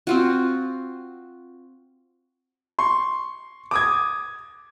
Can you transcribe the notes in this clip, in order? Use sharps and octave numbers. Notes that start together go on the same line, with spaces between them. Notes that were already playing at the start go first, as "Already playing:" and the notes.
C4 F4 F#4
C6 C#6
D6 D#6 G#6